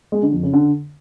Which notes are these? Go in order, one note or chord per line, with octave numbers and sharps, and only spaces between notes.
G#3
D3
F2
C#3
D3